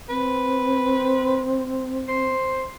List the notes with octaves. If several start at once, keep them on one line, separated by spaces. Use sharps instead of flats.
C4 B4
C5